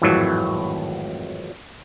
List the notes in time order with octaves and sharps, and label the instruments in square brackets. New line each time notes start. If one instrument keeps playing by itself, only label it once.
[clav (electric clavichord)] G#1 F2 A2 E3 F#3